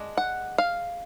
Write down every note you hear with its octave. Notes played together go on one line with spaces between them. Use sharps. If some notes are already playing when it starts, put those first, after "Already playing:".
Already playing: G#3 D4
F#5
F5